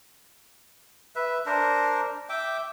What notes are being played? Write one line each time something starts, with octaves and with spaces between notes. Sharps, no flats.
B4 E5
D4 A#4 C5
E5 G5 D6